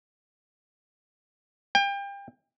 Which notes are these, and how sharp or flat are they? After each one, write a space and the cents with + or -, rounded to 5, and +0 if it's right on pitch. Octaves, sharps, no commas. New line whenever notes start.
G5 +30